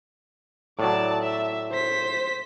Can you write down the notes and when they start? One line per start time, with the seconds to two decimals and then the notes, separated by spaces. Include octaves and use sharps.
0.79 A2 F#3 D5 A5
1.23 E5
1.71 C5 B6